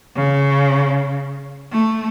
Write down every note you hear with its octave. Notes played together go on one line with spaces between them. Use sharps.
C#3
A3